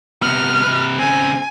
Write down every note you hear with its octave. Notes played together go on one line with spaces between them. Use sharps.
C3 B3 F6
C3 B4
C#3 C4 G#5